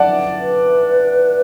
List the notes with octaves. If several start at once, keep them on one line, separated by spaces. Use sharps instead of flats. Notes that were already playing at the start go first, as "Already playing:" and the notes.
Already playing: D5 F#5 A5
B4